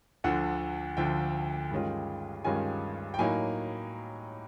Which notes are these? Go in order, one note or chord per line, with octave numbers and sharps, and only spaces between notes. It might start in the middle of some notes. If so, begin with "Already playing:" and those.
D2 D3 F3 F#5
D2 D3 F3 G5
G2 D#3 G#3 C#4 F4
G2 D#3 G#3 C#4 F4 G#5
G5
A2 F#3 A#3 D#4 G#5